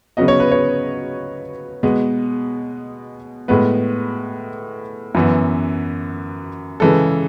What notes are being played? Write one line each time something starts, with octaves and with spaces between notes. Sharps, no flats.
C#3 F#3 B3 D#5
C#5
B4
C#5
B2 G#3 B3
A2 G#3 B3 B4
F#2 E3 B3
C#3 E3 G#3 A4